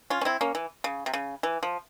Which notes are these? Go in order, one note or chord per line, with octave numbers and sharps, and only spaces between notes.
C#4 F4
C#4
C4 E4
A#3 C#4
E3
C#3
C3
C#3
E3
F3